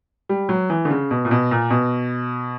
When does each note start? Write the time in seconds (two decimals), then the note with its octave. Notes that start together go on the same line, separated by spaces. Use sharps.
0.29 G3
0.49 F#3
0.70 E3
0.85 D3
0.91 C#3
1.11 B2
1.25 A#2
1.31 B2
1.51 A#2
1.70 B2